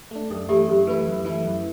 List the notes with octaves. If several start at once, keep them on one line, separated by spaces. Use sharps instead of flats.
A3 D4
F#2 A4
E3 A3 E4 G4
F#2 G4
E3 A3 E4 B4
F#2
E3 A3 E4
F#2